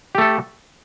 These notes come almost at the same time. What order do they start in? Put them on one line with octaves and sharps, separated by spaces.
G4 A3 A4